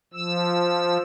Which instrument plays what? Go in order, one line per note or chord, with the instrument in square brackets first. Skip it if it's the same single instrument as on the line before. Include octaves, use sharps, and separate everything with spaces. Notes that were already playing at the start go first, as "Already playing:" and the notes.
[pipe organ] F3 E6